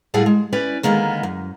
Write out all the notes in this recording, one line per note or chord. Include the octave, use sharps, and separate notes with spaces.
A2 G3 A3 G#4 F5 F#5
G#3
C#4 E4 B4 D5
D3 D#3 G#3 A#3 B3
F#2